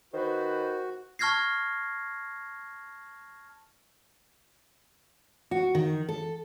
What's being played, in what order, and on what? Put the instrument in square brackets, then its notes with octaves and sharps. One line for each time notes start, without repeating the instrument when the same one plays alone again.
[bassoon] D#3 [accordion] F#4 [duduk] B4 [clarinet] C5
[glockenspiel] A5 C#6 F6 G#6 A#6 C7
[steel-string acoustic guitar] F#4
D#3
A4